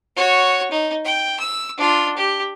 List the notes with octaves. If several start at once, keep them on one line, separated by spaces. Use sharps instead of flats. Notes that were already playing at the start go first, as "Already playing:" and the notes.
F#4 C#5
D#4
G5
E6
D4 F4
G4